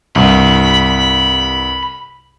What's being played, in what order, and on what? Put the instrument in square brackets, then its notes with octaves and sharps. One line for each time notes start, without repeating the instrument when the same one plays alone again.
[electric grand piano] C2 G2 [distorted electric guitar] B5